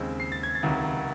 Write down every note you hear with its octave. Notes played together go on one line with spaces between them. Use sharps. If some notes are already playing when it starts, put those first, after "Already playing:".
Already playing: D#2 C#3 G#3 C4
C7
A6
G#6
A6
C#2 C3 D#3 F#3